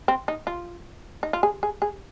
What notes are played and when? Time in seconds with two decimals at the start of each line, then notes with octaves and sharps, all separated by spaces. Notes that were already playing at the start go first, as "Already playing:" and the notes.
0.08 C4
0.28 D#4
0.47 F4
1.23 D#4
1.33 F4
1.43 G#4
1.63 G#4
1.82 G#4